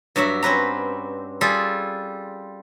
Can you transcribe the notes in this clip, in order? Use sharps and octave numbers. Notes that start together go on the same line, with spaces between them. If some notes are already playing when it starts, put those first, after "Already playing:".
G2 F#3 F#4 E5
C4 C#4 B4 A#5
G3 F4 G#4 A4